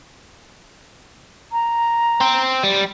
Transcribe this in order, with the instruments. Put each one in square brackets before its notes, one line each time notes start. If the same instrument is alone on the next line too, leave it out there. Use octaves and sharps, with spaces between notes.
[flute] A#5
[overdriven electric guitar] C4
G3